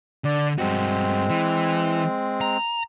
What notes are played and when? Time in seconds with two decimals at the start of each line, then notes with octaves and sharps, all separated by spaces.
0.25 D3 D5
0.58 G2 G#3 C4 F#4
1.30 E3
2.41 A#5